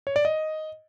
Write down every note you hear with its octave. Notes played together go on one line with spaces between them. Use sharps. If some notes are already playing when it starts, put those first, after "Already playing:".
C#5
D5
D#5